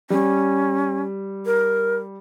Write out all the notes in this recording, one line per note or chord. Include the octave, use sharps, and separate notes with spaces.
G3 C#4
A#4